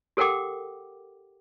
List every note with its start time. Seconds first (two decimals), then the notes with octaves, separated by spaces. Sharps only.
0.17 G4 A4 A#4 F#5 G5 D6